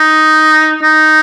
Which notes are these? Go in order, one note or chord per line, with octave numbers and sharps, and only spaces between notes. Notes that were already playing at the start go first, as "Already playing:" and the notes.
Already playing: D#4
D#4